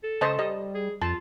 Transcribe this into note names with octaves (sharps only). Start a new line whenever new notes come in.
A4
C#2 C5 D#5 A5
G3 D#5
G#4
F2 F4 A5